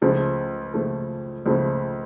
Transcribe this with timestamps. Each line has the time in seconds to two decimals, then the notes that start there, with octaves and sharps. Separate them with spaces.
0.01 C#2 C#3 F3 A3
0.74 C#2 C#3 F3 A3
1.46 C#2 C#3 F3 A3